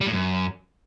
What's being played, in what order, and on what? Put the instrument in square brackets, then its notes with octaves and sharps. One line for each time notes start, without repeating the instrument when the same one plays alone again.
[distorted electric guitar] G3
A2
F#2